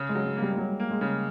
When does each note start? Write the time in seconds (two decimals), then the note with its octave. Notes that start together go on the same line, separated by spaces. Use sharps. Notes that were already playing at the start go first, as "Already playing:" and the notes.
Already playing: C#3
0.09 G#3
0.15 F#3
0.25 G#3
0.36 A#3
0.42 G3
0.53 G#3
0.58 F#3 G3
0.80 A#3
0.91 G#3
1.01 C#3